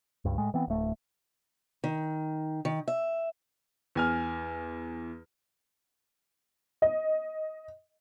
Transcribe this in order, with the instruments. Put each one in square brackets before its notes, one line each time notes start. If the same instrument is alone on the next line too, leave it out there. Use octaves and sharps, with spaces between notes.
[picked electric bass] C#2 G2
A2 G#3
E3 B3 C4
D1 A3
[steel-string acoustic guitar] D#3
D#3
E5
[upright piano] E2 G#5 F6
[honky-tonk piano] D#5